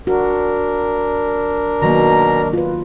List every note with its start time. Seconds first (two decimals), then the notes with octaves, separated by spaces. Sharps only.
0.07 D4 F#4 A#4
1.82 B2 D#3 F#3 A#3 A#5
2.53 F4 B4